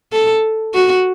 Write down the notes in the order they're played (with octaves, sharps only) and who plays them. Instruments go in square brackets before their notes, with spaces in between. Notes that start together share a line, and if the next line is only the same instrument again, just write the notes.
[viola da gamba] A4
F#4